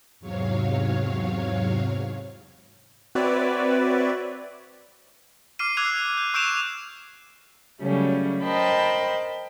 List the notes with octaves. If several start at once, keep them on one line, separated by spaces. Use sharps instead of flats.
E2 G#2 C3 F#3 C#5 F5
C4 F#4 B4 C#5 D5 E5
D6 F6 C7 D#7
D6 E6 F#6 G#6 C7 F7
G6
C#6 E6 G6 D7 E7 F7
C#3 F#3 G3 A3 C#4
A#4 C5 D#5 G5 A5 B5